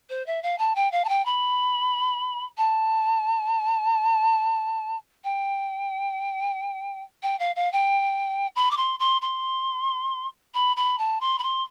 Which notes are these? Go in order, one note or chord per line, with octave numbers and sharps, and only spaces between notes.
C5
E5
F5
A5
G5
F5
A5
G5
B5
A5
G5
G5
F5
F5
G5
B5
D6
C6
C6
C6
B5
B5
A5
C6
B5
C6